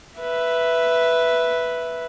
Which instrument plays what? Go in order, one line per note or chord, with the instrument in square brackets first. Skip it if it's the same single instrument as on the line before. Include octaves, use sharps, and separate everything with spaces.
[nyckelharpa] B4 E5